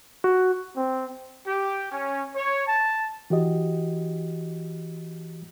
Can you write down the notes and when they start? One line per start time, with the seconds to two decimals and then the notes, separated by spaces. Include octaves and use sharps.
0.24 F#4
0.76 C4
1.46 G4
1.92 C#4
2.35 C#5
2.66 A5
3.30 E3 F#4 G4 D#5